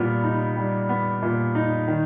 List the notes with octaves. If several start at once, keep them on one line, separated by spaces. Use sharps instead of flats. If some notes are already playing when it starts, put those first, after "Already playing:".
Already playing: A#2 G3 B3
D#4
G3
B3
A#2
D#4
D#3